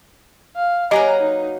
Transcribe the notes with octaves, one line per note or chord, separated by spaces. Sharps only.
F5
F#3 A#3 G4 B4 D#5 G#5 A#5
D#4